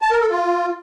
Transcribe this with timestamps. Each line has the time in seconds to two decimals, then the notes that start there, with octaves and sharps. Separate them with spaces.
0.02 A5
0.11 A#4
0.21 A4
0.30 F4